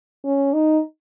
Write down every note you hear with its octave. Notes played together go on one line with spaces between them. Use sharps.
C#4
D#4